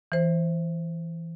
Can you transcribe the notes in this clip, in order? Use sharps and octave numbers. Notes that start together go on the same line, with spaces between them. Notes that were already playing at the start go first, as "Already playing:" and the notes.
E3 C5